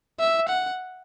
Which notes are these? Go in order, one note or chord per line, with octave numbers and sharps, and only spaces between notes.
E5
F#5